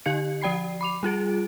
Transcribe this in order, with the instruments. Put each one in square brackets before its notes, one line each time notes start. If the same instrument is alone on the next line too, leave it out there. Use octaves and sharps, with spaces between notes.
[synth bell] D3 G4 F5 C#7
F3 D5 G5 B5 C7
B5 D6 F7
G3 F4 G#4 D7